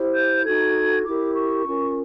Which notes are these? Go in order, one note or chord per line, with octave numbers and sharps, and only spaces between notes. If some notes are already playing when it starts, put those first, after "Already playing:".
Already playing: E4 G4 C5
G6
D#4 F#4 A4 G#6
E4 G4 A#4 D6
C#6
C#4 F4 A#4